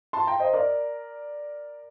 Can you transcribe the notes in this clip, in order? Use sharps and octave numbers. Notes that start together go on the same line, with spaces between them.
A5 C6
G5 A#5
C5 D#5
A#4 D5